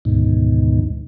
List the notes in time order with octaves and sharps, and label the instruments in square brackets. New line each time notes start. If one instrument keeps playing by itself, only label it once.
[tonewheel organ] D2 G#2 B2 D#3